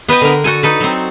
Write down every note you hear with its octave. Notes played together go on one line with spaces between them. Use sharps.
B3 B4 D#5 G5
D3 A#4
F#4 A4 G#5
D#4 A4 B4
F#3 C4